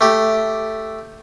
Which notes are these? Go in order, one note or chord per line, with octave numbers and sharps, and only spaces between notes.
A3 G4